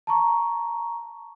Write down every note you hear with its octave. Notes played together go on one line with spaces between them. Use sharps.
A5 A#5 C#6